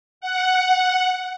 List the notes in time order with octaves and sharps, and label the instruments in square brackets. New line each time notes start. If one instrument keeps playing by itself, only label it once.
[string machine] F#5